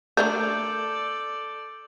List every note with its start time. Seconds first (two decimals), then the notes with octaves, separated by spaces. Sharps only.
0.17 A3 D4 A4 A#4 D5 G6